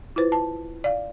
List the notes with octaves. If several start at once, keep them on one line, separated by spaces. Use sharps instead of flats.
E4 F4 B4 C5
A5
D5 F5